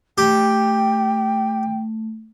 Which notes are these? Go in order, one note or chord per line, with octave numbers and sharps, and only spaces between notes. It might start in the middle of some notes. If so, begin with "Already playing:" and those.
A3 G4 G5